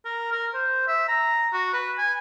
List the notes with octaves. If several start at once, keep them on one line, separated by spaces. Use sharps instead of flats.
A#4
A#4
C5
E5
A#5
F#4
B4
G#5